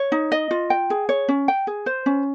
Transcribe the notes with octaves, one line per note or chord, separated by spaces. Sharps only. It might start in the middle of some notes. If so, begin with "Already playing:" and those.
Already playing: C#5
D#4
D#5
F4
G5
G#4
C#5
C#4
G5
G#4
C5
C#4